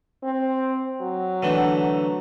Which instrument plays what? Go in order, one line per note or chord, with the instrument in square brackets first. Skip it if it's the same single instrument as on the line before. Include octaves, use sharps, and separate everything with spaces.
[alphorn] C4
F#3
[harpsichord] D3 E3 A3